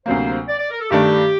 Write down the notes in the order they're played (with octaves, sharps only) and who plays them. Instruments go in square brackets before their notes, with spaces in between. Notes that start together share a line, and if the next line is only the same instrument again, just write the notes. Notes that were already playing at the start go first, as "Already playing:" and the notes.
[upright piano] D2 C3 F#3 A#3 [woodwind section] C5
[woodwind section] D5
D5
A#4
A4
[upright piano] G2 D#3 A3 D4 [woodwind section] G4